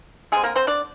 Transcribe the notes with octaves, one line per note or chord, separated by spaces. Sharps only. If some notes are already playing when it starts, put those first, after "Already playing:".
D3 G3 G#3 C4 G#4
A#3 A#4
C4 C5
D4 D5